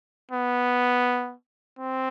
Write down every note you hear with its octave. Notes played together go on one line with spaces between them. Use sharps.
B3
C4